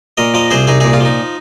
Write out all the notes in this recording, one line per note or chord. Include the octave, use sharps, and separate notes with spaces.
A#2 A#4 D#5
F3 A#4 D#5
C2 G#4 C5
C2 D#4 G#4
A#2 D#4 G#4
F4
F3 D#4